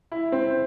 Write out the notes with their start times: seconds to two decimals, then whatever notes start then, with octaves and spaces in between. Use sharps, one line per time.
0.12 E4
0.32 C4